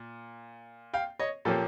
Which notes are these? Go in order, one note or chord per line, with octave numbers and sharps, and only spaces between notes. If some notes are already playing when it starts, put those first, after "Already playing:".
Already playing: A#2
F5 G5
C#5 D#5
A#2 F3 A#3 C#4 G4 A4